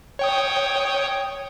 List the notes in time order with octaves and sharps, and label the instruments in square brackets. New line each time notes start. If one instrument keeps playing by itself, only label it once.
[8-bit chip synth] C#5 G5 D#6